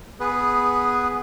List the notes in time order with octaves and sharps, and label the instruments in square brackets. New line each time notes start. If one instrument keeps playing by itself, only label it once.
[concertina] B3 G#4 B4